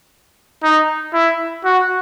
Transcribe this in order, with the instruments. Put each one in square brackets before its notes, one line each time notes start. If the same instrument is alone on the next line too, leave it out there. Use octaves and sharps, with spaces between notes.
[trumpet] D#4
E4
F#4